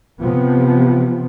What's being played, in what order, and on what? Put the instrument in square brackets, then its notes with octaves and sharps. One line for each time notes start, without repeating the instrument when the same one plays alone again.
[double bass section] C3 F3 B3